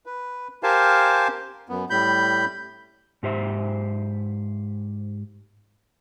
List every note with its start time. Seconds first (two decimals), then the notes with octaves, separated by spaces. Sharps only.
0.06 B4
0.63 G4 A#4 C5 F5 G#5 A5
1.69 F#2 B3
1.90 A2 G3 B5 G6
3.23 G#2 G4 C5 E5